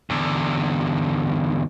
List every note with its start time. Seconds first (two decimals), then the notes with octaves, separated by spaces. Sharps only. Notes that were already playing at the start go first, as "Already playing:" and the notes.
0.10 E2 D3